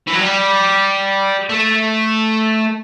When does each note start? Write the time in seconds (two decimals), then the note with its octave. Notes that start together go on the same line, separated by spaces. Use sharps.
0.07 E3
0.14 F#3
0.21 G3
1.49 A3